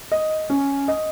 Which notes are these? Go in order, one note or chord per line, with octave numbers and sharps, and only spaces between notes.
D#5
C#4
D#5